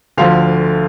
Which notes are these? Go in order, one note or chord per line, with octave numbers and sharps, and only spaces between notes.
D2 D3 F3 F5